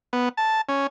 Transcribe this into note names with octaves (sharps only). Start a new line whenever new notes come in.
B3
A5
C#4